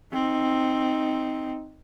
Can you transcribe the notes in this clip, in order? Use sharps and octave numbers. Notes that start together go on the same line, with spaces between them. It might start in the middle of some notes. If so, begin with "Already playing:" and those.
C4 D#4